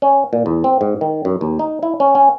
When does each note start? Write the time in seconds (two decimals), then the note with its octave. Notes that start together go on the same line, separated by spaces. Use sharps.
0.02 C#4
0.33 A#2
0.46 E2
0.64 C4
0.81 G#2
1.01 D#3
1.25 F#2
1.41 D#2
1.59 D#4
1.83 E4
2.00 C#4
2.15 C#4